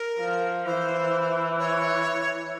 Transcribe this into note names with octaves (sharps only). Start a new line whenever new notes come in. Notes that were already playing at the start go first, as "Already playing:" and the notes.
Already playing: A#4
F3
E3 C5
C#5